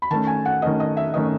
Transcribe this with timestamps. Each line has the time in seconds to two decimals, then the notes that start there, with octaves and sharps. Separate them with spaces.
0.02 B5
0.10 D#3 A3 C#4 A5
0.27 G#5
0.45 F#5
0.62 D#3 A3 C#4 D#5
0.80 D#5
0.97 E5
1.14 D#3 A3 C#4 D#5